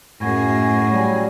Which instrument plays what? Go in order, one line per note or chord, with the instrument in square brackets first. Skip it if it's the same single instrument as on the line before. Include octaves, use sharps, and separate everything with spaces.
[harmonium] F#2 [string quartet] A2 G#4 [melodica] F#4 G#5
[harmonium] F#3 [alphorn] G3